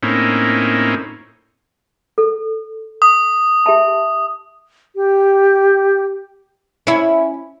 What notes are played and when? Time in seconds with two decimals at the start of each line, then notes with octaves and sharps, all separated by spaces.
0.03 A2 A#3 C4 C#4 D#4 E4
2.18 A4
3.02 D#6
3.66 G4 E5 A5
4.96 G4
6.87 C#4 E4